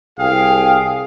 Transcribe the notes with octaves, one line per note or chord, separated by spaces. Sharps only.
C2 G#4 F5 G5